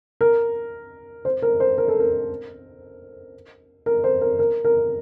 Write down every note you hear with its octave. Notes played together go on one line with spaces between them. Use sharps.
A#4
C5
A#4
C5
A#4
A4
A#4
A#4
C5
A#4
A#4
A#4